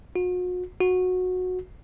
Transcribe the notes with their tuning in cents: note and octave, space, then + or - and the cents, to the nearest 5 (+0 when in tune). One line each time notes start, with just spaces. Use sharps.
F#4 -40
F#4 -15